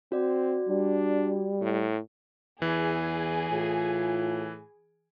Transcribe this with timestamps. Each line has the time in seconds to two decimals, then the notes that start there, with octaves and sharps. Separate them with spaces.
0.12 C4 F#4 D5
0.69 G3 D4
1.61 A2
2.62 E2 E3 G#4 G#5
3.51 A2 F4